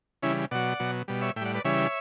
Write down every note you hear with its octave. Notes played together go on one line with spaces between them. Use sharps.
C#3 E3 G3 C#4 E4
B2 F#3 D5 F#5
B2 F#3
B2 G3
C#5 E5
A2 G3 D5 E5 F#5 G5
B4 D5
C#3 E3 G3 C#5 E5